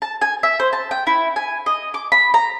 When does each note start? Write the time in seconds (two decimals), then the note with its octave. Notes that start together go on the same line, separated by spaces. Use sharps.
0.02 A5
0.21 G#5
0.43 E5
0.60 C5
0.73 A5
0.91 G5
1.07 E4
1.36 G#5
1.66 D#5
1.94 D6
2.12 B5
2.34 A#5